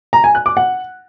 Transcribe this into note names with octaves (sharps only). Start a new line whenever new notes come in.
A#5
G#5
F#6
D6
F#5